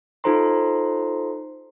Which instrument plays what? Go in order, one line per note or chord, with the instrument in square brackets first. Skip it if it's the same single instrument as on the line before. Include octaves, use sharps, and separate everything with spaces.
[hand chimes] D#4 F4 A4 C5 A#5 C6